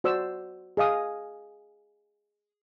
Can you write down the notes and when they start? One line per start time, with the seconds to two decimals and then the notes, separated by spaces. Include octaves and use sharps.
0.04 F#4 C5 D5 E6
0.77 G#4 D#5 F5 D#6